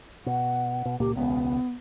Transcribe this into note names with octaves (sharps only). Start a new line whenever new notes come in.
B2 F#5
B2
C#2 A#2 A#3 G4
E1 C#2 B3